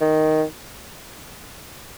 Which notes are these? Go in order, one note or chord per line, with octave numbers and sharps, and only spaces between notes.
D#3